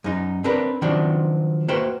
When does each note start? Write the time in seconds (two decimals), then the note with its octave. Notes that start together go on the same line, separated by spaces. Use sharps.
0.04 F#2 D#4
0.44 C4 D4 A#4 B4
0.82 D#3 F3 F#3 C4 D4 F#4
1.68 A#3 F#4 B4 C5 G5